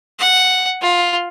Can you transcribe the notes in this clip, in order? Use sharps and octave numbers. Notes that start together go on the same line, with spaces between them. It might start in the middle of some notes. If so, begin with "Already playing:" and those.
F#5
F4